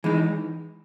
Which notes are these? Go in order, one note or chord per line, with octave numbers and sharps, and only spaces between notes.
E3 G#3 D#4